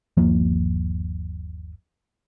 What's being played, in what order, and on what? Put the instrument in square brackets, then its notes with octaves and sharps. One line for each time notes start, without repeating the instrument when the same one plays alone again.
[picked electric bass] G1 D#2 F3 A#3